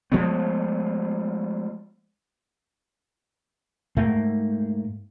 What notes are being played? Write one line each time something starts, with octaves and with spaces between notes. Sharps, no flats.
F3 G#3 A3 B3
G#2 A3 A#3